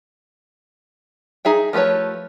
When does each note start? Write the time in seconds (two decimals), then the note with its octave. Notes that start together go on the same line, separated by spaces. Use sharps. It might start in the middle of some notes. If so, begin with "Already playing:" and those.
1.45 D#4 G#4 E5 G5
1.73 F3 A3 G4 B4 C#5